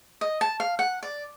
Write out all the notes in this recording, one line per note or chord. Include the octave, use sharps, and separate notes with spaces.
D#5
A5
F5
F#5
D5